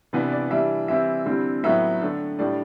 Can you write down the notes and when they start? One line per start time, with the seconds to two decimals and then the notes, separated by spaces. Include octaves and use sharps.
0.13 C3 E3 B3 D4 B4
0.32 D5
0.51 E3 G3 D4 E5
0.88 E3 G3 C4 E4 E5
1.26 D3 G3 C4 E4
1.64 A2 F#3 B3 E5
2.02 D3 A3 D4
2.39 A2 G3 D4 D5